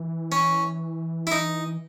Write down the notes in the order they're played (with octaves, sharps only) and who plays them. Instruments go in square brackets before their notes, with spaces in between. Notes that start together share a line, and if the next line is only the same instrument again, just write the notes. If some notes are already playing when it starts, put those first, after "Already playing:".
Already playing: [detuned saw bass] E3
[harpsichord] C#4
E4
D#4